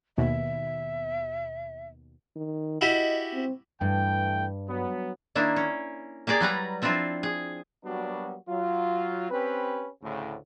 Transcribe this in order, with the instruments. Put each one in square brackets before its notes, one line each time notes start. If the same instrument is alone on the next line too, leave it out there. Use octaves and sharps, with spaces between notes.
[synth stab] D#2 B2 [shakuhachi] E5
[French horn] D#3
[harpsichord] E4 F#4 G4 [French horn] D#5
[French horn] C4
[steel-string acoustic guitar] G2 [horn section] E3 A3 G5
[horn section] F#3 B3
[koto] D#3 A#3 D4 E4
C#4
A#3 G4 G#4 D5
F#3 G3 B4 A#5
F3 C4 D4 E4 F4
G#4
[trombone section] F#3 G3 A#3 B3 D4 F#4
F#3 F4
C4 C#4 G4 B4
D2 A2 C#3